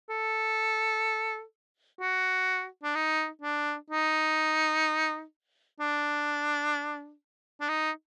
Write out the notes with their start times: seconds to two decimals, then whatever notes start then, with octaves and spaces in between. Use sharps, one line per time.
0.10 A4
2.00 F#4
2.83 D4
2.95 D#4
3.42 D4
3.90 D#4
5.80 D4
7.61 D4
7.69 D#4